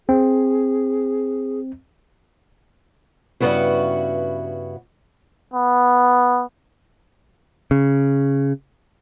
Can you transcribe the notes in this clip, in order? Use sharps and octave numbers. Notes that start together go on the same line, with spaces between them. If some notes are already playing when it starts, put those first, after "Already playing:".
C4 G#4
G2 A#2 C#3 B3 E4 F#4
B3
C#3